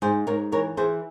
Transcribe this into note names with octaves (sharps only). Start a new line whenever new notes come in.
G#2 G#4 C5
G#2 A#4 C#5
E3 A#4 C#5
E3 G#4 C5